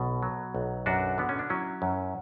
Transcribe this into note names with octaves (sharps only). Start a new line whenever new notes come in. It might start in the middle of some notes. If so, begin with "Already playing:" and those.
Already playing: B1 B2
F#3
B1
F#2 D4 F#4
D3 B3
C#4
D4
F#3 C#4 E4
F#2